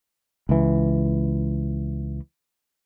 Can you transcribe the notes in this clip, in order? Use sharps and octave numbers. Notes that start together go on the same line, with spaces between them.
C#2 E3